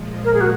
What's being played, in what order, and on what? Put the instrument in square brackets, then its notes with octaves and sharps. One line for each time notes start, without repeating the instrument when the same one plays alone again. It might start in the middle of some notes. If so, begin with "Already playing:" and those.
Already playing: [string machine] A#2 F3 G#3
[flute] A#4
G#4
F#4